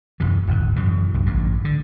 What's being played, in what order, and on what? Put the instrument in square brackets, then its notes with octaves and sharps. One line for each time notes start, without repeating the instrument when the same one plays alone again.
[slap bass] F#1 F#2 C3 E3
D1 G#1 G2
F#2 B2 E3
C2 G2
A1 G2
D3